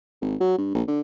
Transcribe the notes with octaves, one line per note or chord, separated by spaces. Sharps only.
G#1
F#3
G2
A#1
D3